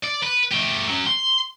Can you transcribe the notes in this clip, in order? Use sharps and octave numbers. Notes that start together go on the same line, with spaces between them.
D5
B4
A3 G4
F#3 C#4
C6